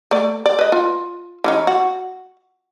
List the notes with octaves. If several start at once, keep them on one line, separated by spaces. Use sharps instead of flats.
A3 D5
D5
B4 D#5
F4
E3 C#4 D#4
F#4